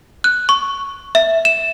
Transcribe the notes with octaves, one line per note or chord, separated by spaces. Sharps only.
F#6
C#6
E5
E7